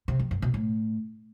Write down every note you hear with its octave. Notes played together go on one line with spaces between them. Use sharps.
C3
F2
G2
B2
A2